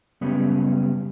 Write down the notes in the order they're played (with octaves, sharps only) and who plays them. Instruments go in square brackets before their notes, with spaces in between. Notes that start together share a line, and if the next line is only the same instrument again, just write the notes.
[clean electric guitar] F#2 C#3 G3 B3 C#4